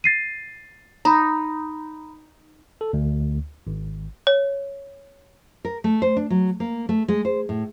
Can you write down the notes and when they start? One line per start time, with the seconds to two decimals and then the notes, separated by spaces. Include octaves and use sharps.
0.04 A6 C7 D#7
1.05 D#4 A#5 B5
2.81 A4
2.93 D2
3.67 G#1
4.27 C#5
5.65 A#4
5.84 A3
6.02 C5
6.17 D4
6.30 F#3
6.60 A#3
6.89 A3
7.08 G#3
7.25 C5
7.49 A2